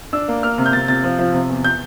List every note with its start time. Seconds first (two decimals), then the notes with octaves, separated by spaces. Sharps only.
0.13 D4 E6
0.28 A#3
0.43 A#3 F6
0.58 C3
0.66 G6
0.73 C3 A6
0.88 C3 A6
1.04 F3
1.19 F3
1.34 C3
1.49 E2
1.64 G6